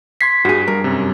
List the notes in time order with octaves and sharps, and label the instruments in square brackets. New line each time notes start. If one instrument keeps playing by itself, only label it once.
[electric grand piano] C6 G#6 C7 [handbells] B6
[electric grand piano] G2 [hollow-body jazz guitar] F#4 G#4
[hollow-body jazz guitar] G2 [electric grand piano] A#4
[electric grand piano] F#2 C3